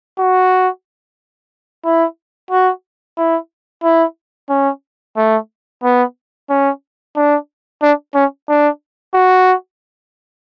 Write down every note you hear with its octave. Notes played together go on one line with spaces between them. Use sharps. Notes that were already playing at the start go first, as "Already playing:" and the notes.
F#4
E4
F#4
E4
E4
C#4
A3
B3
C#4
D4
D4
C#4
D4
F#4